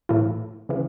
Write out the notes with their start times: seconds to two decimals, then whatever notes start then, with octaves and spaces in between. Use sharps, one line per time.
0.09 A2 E3 A3 E4
0.69 C#3 E3